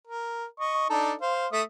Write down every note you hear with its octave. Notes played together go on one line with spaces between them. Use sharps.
A#4
D#5 C#6
D4 D#4 A4
C5 F5
A3 E5 D#6